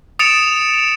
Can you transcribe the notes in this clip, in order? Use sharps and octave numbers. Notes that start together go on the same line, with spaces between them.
D#6 A6 C#7 D7 E7 F7